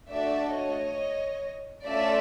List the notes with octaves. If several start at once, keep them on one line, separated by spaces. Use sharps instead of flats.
A3 D4 F#4 A4 D5 E5
C#5 D#5
A3 C#4 F4 A4 D5 E5